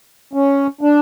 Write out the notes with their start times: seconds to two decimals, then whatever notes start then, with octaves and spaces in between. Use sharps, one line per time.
0.33 C#4
0.81 D4